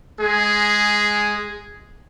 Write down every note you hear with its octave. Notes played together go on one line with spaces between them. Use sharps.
G#3 G#4